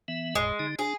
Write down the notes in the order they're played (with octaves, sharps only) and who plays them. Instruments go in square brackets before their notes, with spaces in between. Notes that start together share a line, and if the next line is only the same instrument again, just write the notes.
[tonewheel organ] E3 B3 E5
[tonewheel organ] F#1 E2 A2 [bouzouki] G#3
[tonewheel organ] D3 D#4
[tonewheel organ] D4 [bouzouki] G#4